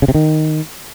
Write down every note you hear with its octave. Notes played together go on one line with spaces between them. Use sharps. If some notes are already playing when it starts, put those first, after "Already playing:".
C#3
C3
D#3